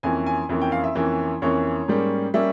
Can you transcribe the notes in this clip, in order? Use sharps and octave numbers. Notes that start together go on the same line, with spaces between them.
F2 E3 A#3 C#4 G#5
G#5
F2 E3 A#3 C#4
G5
F5
E5
F2 E3 A#3 C#4
F2 E3 A#3 C#4 C#5
G#2 G3 A#3 C#4
G3 A#3 C#4 E5